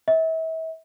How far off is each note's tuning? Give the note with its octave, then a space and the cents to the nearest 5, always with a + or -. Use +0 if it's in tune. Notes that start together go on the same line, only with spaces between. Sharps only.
E5 -35